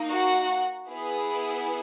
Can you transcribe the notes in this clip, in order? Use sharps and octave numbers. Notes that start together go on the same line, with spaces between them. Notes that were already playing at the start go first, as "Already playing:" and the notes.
Already playing: A#3 D#4
F#4 F#5
B3 E4 G#4